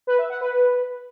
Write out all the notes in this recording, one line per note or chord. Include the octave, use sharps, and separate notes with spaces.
B4
E5
F#5
B4